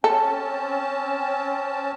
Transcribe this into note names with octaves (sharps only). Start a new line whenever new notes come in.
C4 C#4 A4 A5